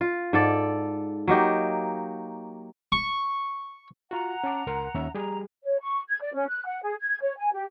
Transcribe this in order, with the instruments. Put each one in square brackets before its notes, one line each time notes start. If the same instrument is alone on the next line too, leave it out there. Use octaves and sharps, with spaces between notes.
[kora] F4
G#2 A4 D5
F#3 A#3 D#4 G4
[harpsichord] C#6
[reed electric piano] F4 F#4 [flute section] F#5 A#5
[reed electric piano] C#4 A5 D6
C#2 A#4 C6
D#2 C#4 E5
[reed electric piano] G3 G4 G#4 [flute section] A#5
[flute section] C#5
C#6
G#6
D5
C#4
F#6
F#5
G#4
G#6
C#5
G#5
G4